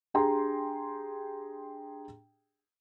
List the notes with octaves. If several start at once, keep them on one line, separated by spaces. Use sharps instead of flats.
D4 G4 G#4 G5 A#5 C6